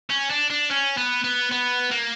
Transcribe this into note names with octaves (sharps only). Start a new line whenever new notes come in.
C#4
D4
D4
C#4
B3
B3
B3
A#3